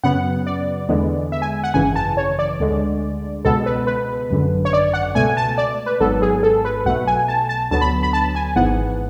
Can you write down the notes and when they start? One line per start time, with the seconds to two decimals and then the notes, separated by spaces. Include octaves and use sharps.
0.04 F#2 C#3 F#3 B3 F#5
0.47 D5
0.89 E2 D3 G#3 B3
1.32 E5
1.42 G#5
1.64 F#5
1.74 G#1 F#2 C#3 E3 G#5
1.96 A5
2.17 C#5
2.39 D5
2.60 D2 D3 G#3
3.45 C#2 B2 G#3 B3 A4
3.66 B4
3.87 B4
4.30 G#1 F#2 D3
4.65 C#5
4.73 D5
4.94 F#5
5.15 C#2 B2 A3 G#5
5.37 A5
5.58 D5
5.86 B4
6.00 G#1 G#2 F#3 B3 A4
6.22 G#4
6.43 A4
6.65 B4
6.86 B1 B2 A3 F#5
7.07 G#5
7.28 A5
7.49 A5
7.71 D2 D3 F#3 B3 A5
7.81 B5
8.03 B5
8.13 A5
8.35 G#5
8.55 G#1 G#2 E3 B3 F#5